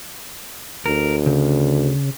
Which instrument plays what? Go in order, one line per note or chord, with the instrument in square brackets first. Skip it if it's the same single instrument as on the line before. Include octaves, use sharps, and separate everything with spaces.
[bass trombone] D2 [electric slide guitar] A#4
[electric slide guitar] C#3